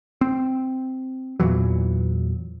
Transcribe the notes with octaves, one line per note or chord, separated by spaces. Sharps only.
C4
E2 A#2 E3 F#3